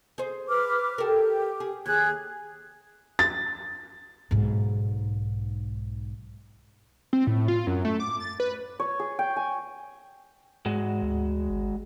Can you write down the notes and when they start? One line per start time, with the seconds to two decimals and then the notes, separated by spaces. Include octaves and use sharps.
0.18 G#4 C5
0.49 B4 D6 F6
0.98 G4 A4 A#4
1.60 G#4
1.86 D#2 G#4 F#6 G#6
3.19 A6
4.31 B1 G#2
7.13 C4
7.27 A2
7.48 F4
7.67 F#2
7.85 A3
8.00 D6
8.20 A6
8.40 B4
8.80 C#5
9.00 G#4
9.19 G5
9.36 G#5
10.66 G#2 G#3 F#4
11.02 D2
11.50 G#1